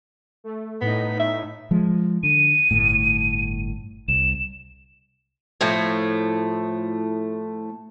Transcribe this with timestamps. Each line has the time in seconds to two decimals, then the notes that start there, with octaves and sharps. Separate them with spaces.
0.44 A3
0.81 A2 B3 D#4
1.20 E5
1.71 F3 G#3
2.23 D3 D#7
2.71 G1 A2
4.08 C2 E7
5.61 A2 F3 A3